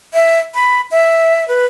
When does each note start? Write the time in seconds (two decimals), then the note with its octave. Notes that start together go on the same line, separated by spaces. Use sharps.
0.14 E5
0.54 B5
0.91 E5
1.48 B4